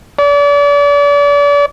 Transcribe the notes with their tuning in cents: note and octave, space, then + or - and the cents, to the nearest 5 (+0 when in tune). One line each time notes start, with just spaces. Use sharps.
D5 -40